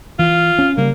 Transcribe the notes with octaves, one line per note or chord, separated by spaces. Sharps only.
E3 F4
C#4
C#3 G3 A#3